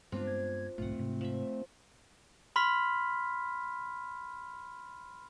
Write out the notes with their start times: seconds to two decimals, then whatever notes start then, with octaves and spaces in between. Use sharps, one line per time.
0.12 G2 G#3 B3 C4 D4 F4
0.27 G#6
0.78 D1 B1 G#2 A3 C4 F4 F#5
0.99 G#2 C3
1.21 F3 E5
2.56 B5 C6 F6 B6